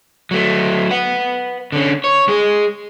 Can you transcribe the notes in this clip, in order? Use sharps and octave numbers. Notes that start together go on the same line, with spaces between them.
F#3 A3
B4 F#5
D3 C#4
C#5
G#3 G#4